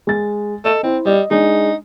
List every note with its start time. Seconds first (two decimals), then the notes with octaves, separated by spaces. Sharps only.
0.07 G#3 A6
0.65 A4 D#5
0.83 C4 E4 C5
1.06 G3 D#5
1.31 G#3 D4 D#4